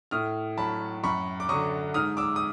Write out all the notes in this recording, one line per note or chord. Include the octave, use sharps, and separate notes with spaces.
A2 D#6 F6
F#3 A5 B5
F#2 B5 C#6
D6
D3 F#3 C#6 D#6
G#2 D#6 F6
D6 E6
D#6